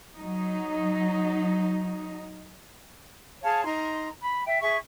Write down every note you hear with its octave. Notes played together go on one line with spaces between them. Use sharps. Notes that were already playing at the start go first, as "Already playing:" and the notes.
F#3 D#4
G#4 C#5 F5 A5
D#4 A#5 C6
B5
E5 G5
G#4 E5 C#6